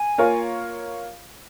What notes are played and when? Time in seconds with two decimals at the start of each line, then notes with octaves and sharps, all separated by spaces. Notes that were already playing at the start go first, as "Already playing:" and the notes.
Already playing: G#5
0.18 A#3 F4 A#4 C#5 F5